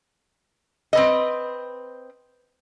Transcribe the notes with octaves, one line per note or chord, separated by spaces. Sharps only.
C4 B4 D#5